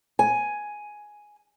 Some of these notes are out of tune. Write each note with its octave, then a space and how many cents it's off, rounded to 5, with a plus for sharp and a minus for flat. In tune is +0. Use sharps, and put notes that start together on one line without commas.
G#5 +5